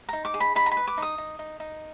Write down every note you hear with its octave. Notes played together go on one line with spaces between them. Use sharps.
D#4 A#5
D6
G#4
B5
D#4 B5
A#5
B5
B4
D6
D#4 D#6
D#4
D#4
D#4